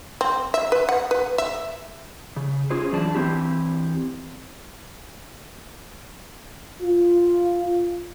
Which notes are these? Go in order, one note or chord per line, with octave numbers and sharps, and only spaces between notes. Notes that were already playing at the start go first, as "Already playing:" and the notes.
C4
E5
B4
F#5
B4
E5
C#3
C#4 F4 G#4 C5
F#2 E3 D4 D5 A5
E3 C4 E4 G4
F4